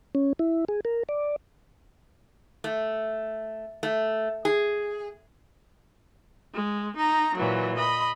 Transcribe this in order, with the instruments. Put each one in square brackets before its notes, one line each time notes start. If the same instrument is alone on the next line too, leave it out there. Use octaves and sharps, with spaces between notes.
[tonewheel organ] C#4
E4
G#4
A#4
D5
[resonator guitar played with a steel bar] A3
A3
G#4
[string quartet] G#3
D#4 A#5
A#2 E3 F#3
D#5 B5